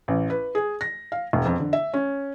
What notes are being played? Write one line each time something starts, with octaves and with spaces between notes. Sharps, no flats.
A1
B4
G#4
A#6
F5
E1
F2
D3
E5
C#4